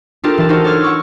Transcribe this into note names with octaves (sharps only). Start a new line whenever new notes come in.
D4 D#4 F4 G4 A4 A#4
E3 A5
D#4 F4 F#4 A4 A#4 C5
A4 C#5 D6 F6 G#6
F#5 C#6 D6 E6